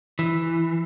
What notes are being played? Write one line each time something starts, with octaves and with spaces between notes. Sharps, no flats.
E3